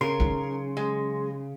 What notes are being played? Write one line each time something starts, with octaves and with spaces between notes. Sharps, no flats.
C#3 A#4 C6
F#3 D#4
G#3